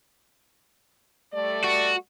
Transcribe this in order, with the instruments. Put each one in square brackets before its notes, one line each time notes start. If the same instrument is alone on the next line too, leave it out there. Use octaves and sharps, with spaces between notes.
[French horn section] G3 A3 D5
[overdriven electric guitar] F#4